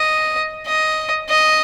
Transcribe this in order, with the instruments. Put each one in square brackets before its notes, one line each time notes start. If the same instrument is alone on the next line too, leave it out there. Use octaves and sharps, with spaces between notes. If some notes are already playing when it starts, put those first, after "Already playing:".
Already playing: [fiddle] D#5
D#5
D#5